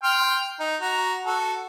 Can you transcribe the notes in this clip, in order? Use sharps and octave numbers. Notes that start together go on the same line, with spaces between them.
G5 C6 F6
D#4
F#4 A#5
F#4 A4